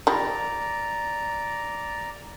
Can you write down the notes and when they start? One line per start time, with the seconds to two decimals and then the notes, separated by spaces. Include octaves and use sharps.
0.07 D#3 F3 G3 D5 A#5